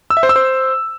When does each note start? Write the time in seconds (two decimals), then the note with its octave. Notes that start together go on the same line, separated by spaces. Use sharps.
0.10 E6
0.17 E5
0.23 C5
0.29 E6
0.36 C5